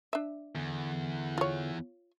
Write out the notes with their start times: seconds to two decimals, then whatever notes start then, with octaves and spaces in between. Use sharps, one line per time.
0.13 D4 E5
0.55 E2 D3
1.38 F4 C#5